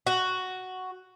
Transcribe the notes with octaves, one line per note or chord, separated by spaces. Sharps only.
F#4